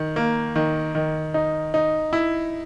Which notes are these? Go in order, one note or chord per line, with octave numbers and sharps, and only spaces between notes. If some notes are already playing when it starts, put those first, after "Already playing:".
Already playing: D#3
A#3
D#3
D#3
D#4
D#4
E4